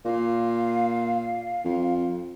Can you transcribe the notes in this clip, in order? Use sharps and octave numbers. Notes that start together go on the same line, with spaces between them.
A#2 F5
F2